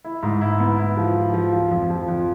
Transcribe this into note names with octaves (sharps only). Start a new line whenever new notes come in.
E4
G#2
E4
B3
E4
F3
F3
F3
F3
F2
F3
F2